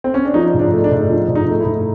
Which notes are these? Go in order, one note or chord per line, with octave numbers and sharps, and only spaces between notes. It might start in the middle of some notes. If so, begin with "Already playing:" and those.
C4
C#4
D4
F3 D#4
G#2
D4
A3
D4
G#2
F3 D4
G#2
D#4
A3
E4
G#2